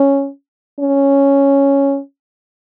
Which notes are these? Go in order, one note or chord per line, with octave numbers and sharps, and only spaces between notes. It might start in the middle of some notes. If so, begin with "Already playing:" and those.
Already playing: C#4
C#4